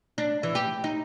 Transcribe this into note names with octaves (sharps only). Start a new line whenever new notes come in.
D4
E3
G4
D#4